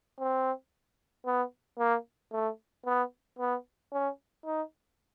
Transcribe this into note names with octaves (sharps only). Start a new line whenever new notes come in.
C4
B3
A#3
A3
B3
B3
C#4
D#4